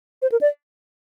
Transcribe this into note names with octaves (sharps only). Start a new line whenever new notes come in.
C5
A#4
D5